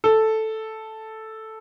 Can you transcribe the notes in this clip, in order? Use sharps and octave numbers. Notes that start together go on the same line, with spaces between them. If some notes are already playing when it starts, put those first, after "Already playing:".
A4